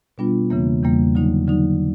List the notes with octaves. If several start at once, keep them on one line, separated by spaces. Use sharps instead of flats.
B2 G3 B3 D4 F4
E2 C#3 E3 G3 A#3
E2 C#3 E3 G3 A#3
D3 F#3 A#3 D#4
D3 F#3 A#3 D#4